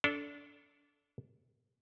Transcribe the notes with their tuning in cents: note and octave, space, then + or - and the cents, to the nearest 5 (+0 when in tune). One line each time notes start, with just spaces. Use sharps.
D4 -25 A4 +0